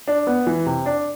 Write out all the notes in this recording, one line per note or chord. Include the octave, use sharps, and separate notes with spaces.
D4
B3
E3
C3
D4